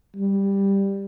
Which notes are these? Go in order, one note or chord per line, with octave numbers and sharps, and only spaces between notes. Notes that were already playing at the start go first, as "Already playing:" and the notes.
G3